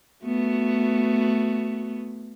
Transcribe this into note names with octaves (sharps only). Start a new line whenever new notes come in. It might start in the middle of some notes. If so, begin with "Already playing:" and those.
A3 B3 F#4